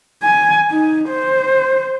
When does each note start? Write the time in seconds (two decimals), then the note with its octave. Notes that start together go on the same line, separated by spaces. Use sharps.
0.23 G#5
0.71 D#4
1.09 C5